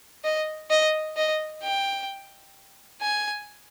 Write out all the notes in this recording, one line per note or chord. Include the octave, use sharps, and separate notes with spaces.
D#5
D#5
D#5
G5
G#5